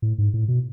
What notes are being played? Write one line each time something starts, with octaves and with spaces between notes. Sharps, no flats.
A2
G#2
A2
B2